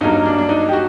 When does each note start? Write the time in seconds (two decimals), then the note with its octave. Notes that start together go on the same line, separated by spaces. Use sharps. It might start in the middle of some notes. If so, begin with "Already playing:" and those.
0.01 G2 F#3 A#3 D#4
0.26 D4
0.38 D4
0.49 D#4
0.69 G4
0.73 F#4